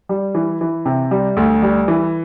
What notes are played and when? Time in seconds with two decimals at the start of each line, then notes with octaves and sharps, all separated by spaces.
0.09 G3
0.35 E3
0.61 E3
0.86 C3
1.11 G3
1.37 D2
1.62 G3
1.88 E3